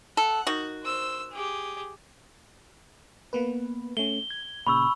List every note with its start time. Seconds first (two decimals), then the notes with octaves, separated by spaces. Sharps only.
0.17 A4 F#5
0.47 D#3 F#4
0.83 C5 E6
1.31 G4 G#4
3.33 A#3 B3 B4
3.97 A3 C#4 G7
4.30 G#6
4.67 A#2 C#3 B5 C#6 E6